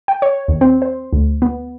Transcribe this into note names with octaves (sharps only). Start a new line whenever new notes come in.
G5
C#5
D#2
C4
C5
D2
B3